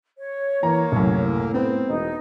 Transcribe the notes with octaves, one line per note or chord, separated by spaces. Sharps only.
C#5
E3 A#3 A#5
C2 F#2 A2
B3 C4 B4
E1 D#4